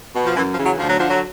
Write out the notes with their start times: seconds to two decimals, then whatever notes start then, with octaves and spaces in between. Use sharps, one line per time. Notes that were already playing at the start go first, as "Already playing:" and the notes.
0.15 B2
0.24 F3
0.36 F#2 E3
0.50 F3
0.57 C#3 E3
0.65 F#3
0.78 D2 F3
0.89 F#3
0.99 D3 F3
1.09 F#3